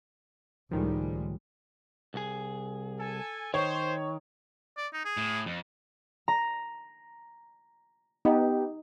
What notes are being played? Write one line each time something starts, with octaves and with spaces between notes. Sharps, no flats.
C#2 A2 D#3 F3 G3 G#3
C2 G#4
A4 G#5
D#3 C5 C#5
D5
D#4
G#4
A2
F2
A#5
B3 D#4 G4